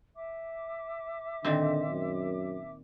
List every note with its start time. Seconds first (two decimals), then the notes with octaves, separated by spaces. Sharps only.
0.15 E5 D6
1.45 A#2 D3 D#3 C4
1.89 F#2